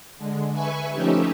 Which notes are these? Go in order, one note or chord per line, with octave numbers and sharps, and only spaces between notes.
D3 G#3
B4 E5 G#5 C#6
F3 A3 C#4 D#4 G4 E5